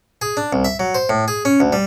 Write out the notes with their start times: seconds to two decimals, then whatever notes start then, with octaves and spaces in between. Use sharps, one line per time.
0.22 G#4
0.37 D4
0.53 C2
0.65 E5
0.80 F#3
0.95 C5
1.09 A2
1.28 G#4
1.45 C#4
1.60 D2
1.73 G3